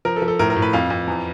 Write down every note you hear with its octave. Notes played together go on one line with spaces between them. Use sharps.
F3 A#4
A4
F3
A4
A2 A#4
A#4
A2
B4
F2 F5
F2
E2